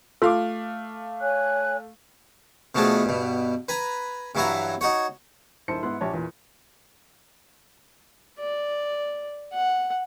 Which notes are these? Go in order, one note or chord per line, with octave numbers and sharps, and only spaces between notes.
A3 F4 A4 F5 D6
C#5 G#5 F#6
B2 F3 A3 D4 G#4
G2 B2
B4 G#5 A#5
G2 E3 F#3 E4 G#5 A#5
D#4 F#4 C#5
D#1 D#3 E4 C5 A5 C#7
G#2 B3 E4 C6 F#6
A#1 G4 C#5 A5
E2 A#2
D5
F#5